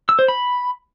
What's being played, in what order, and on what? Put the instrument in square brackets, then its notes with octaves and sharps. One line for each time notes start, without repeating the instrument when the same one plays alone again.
[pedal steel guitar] E6
C5
B5